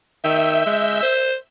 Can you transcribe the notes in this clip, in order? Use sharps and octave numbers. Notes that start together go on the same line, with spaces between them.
D#3 E5 E6 G6
G#3
C5